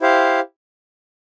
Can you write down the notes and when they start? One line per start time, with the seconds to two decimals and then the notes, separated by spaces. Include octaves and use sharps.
0.01 E4 G4 C5 F5